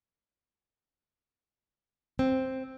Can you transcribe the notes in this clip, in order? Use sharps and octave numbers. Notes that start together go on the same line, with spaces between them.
C4